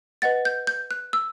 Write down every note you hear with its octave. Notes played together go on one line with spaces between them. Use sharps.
B4 D#5 F#5 A6
G6
G6
F#6
E6